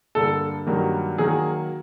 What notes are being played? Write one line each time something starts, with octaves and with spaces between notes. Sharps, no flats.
G2 D3 G3 A#3 A4
G2 D#3 F#3 A#3
D#3 F#3 A#3 G#4